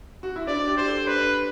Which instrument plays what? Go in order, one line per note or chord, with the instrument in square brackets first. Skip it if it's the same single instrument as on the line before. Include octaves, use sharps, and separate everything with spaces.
[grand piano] F#4
E4
[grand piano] D4 [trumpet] D5
[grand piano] G4
[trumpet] C5
[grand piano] A4
[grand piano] D4 [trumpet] B4